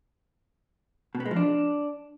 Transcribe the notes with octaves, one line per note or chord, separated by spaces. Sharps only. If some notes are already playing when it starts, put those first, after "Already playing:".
B2
B3
G#3
F3
D4